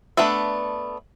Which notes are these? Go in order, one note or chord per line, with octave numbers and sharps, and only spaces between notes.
A3 B3 D4 B4 E5